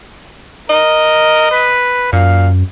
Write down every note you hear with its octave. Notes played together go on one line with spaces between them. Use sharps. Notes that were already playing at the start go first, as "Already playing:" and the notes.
A#4 D#5
B4
F#2 A#2 F5